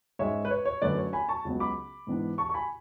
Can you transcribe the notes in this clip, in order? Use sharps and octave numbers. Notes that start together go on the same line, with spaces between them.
G#2 G#3 C#4 C#5 E5
B4
C#5
C#5
F#2 D3 A3 C#4 B4 D5
C#5
G#5 B5
A5 C#6
C#2 C#3 F#3 B3
B5 D6
G#2 E3 B3 D4
A5 C#6
C#6
G#5 B5